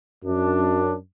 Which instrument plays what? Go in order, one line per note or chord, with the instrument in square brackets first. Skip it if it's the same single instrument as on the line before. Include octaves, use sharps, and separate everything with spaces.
[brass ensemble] F#2 D4